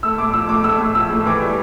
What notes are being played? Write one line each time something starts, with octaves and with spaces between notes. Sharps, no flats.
A3 E6
A2 D6
F3 E6
A2 D6
A3 E6
A2
F3 E6
A2
E3 D6
G3